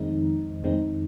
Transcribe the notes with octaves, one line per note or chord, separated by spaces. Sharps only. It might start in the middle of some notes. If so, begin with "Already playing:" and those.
Already playing: F2 D#3 G#3 C4 D#4
F2 D#3 G#3 C4 D#4